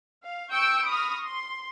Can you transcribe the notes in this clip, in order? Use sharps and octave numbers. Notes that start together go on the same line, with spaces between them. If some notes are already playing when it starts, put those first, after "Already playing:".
F5
G5 C#6 E6 G6 C#7 D7
B5 C#6 D#6 F6 A#6
C6